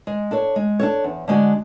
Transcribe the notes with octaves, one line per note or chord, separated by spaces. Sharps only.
G#3
D4 A4 C#5
G#3
D4 A4 C#5
E2
D3 G#3 D4 F#4